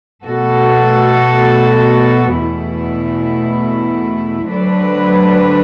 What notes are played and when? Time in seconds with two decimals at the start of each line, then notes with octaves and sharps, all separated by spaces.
0.24 B2 A3 F#4 A4
2.37 E2 B2 A3 E4
4.48 D2 D3 F#3 D4 B4